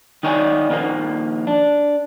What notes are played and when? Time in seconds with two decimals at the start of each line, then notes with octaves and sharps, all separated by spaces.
0.23 D#3 D#4 C#5 D5 G#5
0.70 A#2 D#3 F3 G3 A#3
1.47 D4